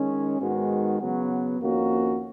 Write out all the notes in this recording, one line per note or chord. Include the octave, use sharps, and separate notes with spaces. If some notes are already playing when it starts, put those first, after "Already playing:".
Already playing: D#3 G#3 C#4
G#2 D#3 G#3 B3 F#4
C#3 F#3 B3
F2 D#3 A#3 C#4 F#4